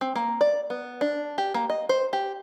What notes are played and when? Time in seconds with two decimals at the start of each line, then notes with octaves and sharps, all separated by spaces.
0.01 C4
0.15 A#3
0.41 D5
0.70 B3
1.01 D4
1.38 G4
1.54 A#3
1.70 D#5
1.89 C5
2.13 G4